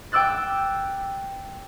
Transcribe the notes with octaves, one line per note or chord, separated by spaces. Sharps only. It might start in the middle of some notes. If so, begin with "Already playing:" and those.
G5 D6 E6 F#6 A6